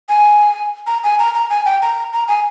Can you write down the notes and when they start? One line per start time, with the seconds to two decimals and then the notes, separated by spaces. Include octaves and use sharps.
0.09 G#5
0.87 A#5
1.04 G#5
1.19 A#5
1.34 A#5
1.50 G#5
1.65 G5
1.82 A#5
2.13 A#5
2.28 G#5